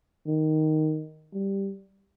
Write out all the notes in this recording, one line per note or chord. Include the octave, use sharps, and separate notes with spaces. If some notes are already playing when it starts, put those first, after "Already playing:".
D#3
G3